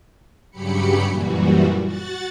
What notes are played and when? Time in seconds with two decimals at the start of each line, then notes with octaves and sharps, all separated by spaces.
0.51 G2 C#3 F#3 G4 B5 C#7
1.08 F#2 A#2 E3 G3 F#4
1.84 F#4 F#5 A6